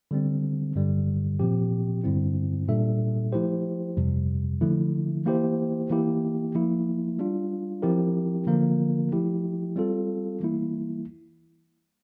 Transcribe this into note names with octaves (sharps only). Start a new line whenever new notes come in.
D3 G3 C4
G2 D3 G3
A#2 F3 C4 G4
G2 D3 G3 C4 E4
A#2 G3 D4 A4 E5
F3 A3 E4 G4 C5
F2 C3 G3
D3 F3 A3 E4
E3 A#3 E4 G4 C5
E3 A#3 E4 G4
F3 A#3 E4
G3 D4 F4
F3 C4 E4 G4 A#4
D3 F3 A#3 F4 A#4
F3 A3 E4 G4
G3 C4 F4 A4
E3 G3 A#3 E4